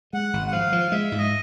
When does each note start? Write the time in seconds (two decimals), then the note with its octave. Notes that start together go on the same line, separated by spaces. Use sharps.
0.13 G#3 F#5
0.33 G#1
0.47 F#5
0.52 F3 F5
0.72 F3
0.92 G#3 E5
1.12 G#2
1.18 D#5